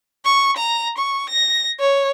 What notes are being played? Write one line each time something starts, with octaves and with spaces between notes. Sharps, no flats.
C#6
A#5
C#6
A#6
C#5